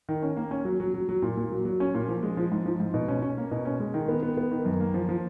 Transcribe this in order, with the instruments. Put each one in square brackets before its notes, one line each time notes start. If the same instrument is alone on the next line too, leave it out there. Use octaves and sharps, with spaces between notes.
[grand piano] D#3
C#4
A#3
C#4
F#3
F#3
F#3
F#3
A#2
A#2
F#3
F#3
C#4
A#2
F3
G#3
F3
G#2
F3
G#2
B2
C#4
C#4
A#3
B2
C#4
G#3
D#3
B3
B3
B3
D#3
F#2
A#3
F3
F3